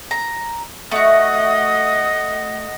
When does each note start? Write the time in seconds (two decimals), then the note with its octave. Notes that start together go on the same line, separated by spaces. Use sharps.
0.11 A#5
0.91 A3 F#4 D#5 F#5 D#6